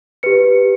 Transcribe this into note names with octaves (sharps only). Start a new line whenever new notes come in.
G4 B4 C#7